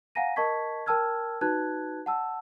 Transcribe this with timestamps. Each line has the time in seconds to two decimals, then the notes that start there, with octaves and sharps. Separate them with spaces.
0.15 F5 F#5 G#5 A#5 A#6 D#7
0.36 A#4 D#5 A5 C#6 G#6 B6
0.86 A#4 G5 A5 E6 F6 G#6
1.41 D#4 F#4 B4 A5 F#6 G#6
2.06 F#5 A5 E6